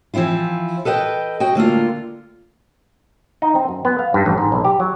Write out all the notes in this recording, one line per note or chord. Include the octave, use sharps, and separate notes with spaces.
E3 F3 C4 E4 F4
A4 B4 D#5 F#5 G5
F#4 D#5 G5
D3 A3 A#3 F4
D#4
C4
F#2
B3
F5
G2
A1
G#2
B1
G4
F#3